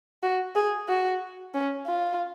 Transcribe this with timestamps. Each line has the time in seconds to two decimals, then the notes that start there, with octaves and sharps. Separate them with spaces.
0.23 F#4
0.56 G#4
0.89 F#4
1.54 C#4
1.86 F4